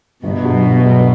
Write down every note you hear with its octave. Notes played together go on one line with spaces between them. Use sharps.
G1 B2
G2 F#3
G1
G2 F#3